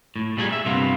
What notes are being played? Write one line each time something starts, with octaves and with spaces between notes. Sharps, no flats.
A2
A#2 G3 G#4 C5 G#5
E5
G2 C3 A#3 B3 F4